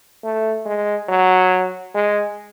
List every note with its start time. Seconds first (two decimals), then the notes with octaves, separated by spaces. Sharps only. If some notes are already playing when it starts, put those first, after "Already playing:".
0.23 A3
0.66 G#3
1.09 F#3
1.95 G#3